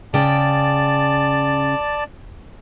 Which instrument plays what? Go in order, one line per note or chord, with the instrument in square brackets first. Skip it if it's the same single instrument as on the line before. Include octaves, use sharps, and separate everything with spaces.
[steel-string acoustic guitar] C#3 G5 [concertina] D5 A5